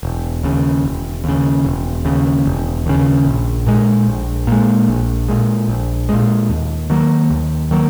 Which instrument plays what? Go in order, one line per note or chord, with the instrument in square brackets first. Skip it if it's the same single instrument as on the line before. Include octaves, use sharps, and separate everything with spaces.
[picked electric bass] E1
D#2 C#3
E1
D#2 C#3
E1
D#2 C#3
E1
D#2 C#3
A#1
A#2 G#3
A#1
A#2 G#3
A#1
A#2 G#3
A#1
A#2 G#3
D#2
D#3 F#3 A#3
D#2
D#3 F#3 A#3